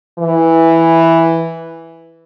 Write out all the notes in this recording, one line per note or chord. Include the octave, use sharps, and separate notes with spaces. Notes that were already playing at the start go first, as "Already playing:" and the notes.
E3